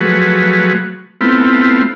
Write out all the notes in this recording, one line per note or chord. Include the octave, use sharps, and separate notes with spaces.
F3 F#3 A3 F#4 G#4 B4
A3 B3 C4 E4 F4